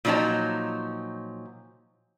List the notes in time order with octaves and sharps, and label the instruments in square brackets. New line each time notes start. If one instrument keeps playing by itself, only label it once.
[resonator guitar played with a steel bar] A#2 F3 F#3 D#4 C#5 A5